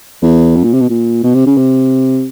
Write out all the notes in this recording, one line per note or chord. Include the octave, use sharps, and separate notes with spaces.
E2
F2
A#2
C3
B2
A#2
B2
C3
C#3
C3